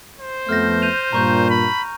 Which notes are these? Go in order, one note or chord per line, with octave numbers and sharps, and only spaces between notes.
C5
F2 A3 B3 F6 G6 A#6
G6 D#7 F7
G2 A#2 A#5 C#6 G6
B5